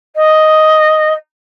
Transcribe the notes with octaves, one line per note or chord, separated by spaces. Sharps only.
D#5